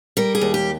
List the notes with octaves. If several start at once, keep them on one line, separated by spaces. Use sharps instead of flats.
G3 A#4
G#4
D#2
G4